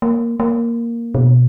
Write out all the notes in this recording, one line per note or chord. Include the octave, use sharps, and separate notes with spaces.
A#3
A#3
B2